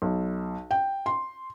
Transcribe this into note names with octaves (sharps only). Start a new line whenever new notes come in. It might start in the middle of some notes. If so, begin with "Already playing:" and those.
B1
G5
C6